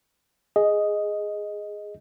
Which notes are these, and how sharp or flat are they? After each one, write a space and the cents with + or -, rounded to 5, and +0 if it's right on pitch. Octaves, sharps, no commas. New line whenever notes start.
G#4 +0 D#5 +0